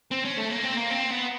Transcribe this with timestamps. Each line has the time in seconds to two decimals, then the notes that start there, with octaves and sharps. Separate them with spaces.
0.11 C4
0.25 C#4
0.38 A3
0.51 A#3
0.64 C4
0.77 A#3
0.91 C4
1.11 B3